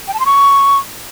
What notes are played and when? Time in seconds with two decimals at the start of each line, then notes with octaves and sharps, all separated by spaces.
0.08 G5
0.14 A5
0.20 C6
0.26 C#6